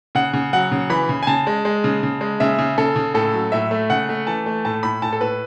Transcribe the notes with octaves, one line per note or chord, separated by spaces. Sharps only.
C#3 F#5
C#3
F#3 F#5
C#3
E3 B5
C#3
G#5
C#3 A5
G#3
G#3
C#3
C#3
G#3
C#3 E5
C#3
C#3 A4
C#3
A2 A4
F#3
A2 E5
A3
C#3 F#5
A3
E3 A5
A3
A2 A5
A2 B5
A2 A5
A4
A2 B4